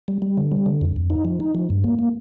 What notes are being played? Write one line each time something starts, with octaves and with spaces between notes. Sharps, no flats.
G3
G3
D3
G3
D3
F2
F2
D#4
F3
D#4
F3
G2
A#3
A#3